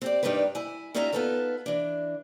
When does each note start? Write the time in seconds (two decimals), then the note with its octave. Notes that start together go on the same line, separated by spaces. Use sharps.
0.01 C4 G4 D5
0.23 G2 G3 D4 D#4 A#4 B4
0.55 E4 G#5
0.95 G3 C#4 D#4 F4 E5 A#5
1.13 B3 D#4 F4 A4 B4 C#5
1.66 E3 D4